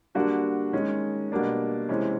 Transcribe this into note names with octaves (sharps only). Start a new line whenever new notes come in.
D3 G3 A#3 D4 F#4
D#3 G#3 C#4
B2 G3 A#3 D4
C3 E3 G#3 C#4